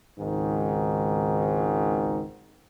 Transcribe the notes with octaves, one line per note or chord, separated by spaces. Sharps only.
G#1 C#2 G#2 D#3